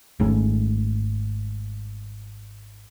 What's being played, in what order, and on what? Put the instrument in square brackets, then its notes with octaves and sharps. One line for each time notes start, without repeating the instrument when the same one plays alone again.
[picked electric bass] G#1 G#2 A3 C#4